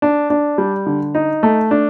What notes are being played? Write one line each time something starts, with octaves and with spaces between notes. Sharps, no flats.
D4
D4
G3
D3
D#4
A3
D4